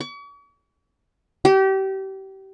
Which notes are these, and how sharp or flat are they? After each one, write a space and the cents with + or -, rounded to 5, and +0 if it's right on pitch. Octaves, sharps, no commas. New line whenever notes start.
C#6 +45
G4 -30